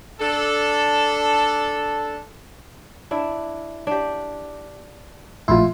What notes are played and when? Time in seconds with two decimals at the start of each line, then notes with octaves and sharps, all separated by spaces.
0.20 D4 A4
3.11 D4 E4
3.87 D4 G4
5.48 A#1 A2 E4 F4 C6